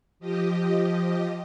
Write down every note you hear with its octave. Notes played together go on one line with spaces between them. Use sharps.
F3 G4 D#5